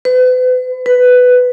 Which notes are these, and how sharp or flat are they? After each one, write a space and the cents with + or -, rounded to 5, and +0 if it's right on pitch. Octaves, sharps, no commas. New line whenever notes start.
B4 +40
B4 +10